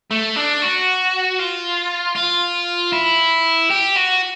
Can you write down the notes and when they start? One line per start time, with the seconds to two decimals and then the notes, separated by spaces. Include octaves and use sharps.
0.11 A3
0.36 D4
0.62 F#4
1.39 F4
2.16 F4
2.93 E4
3.70 G4
3.96 F#4